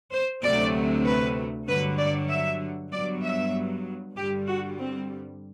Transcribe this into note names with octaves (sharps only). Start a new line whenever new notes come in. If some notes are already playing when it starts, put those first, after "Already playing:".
C5
D2 C3 F#3 A3 D5
B4
G2 D3 F#3 B4
D5
E5
G2 F#3 B3 D5
E5
G2 D3 G3 G4
F#4
C4